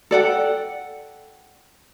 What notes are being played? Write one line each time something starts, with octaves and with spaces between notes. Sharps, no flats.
A4 D5 F#5 G5